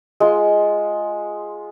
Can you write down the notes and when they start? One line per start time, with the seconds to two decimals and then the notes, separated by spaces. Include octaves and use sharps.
0.20 G#3 F4